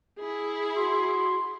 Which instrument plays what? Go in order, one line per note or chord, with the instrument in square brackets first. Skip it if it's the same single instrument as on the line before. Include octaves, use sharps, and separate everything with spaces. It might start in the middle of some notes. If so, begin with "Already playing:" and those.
[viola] E4 G#4
[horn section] F#4 C6